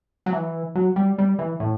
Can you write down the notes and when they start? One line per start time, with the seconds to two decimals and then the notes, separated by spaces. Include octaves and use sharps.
0.26 F#3
0.33 E3
0.75 F#3
0.96 G3
1.18 G3
1.39 E3
1.60 A2